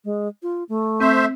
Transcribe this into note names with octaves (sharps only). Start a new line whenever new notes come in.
G#3
F4
A3
C4 C5 E5